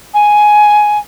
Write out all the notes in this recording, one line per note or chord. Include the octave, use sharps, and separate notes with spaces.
G#5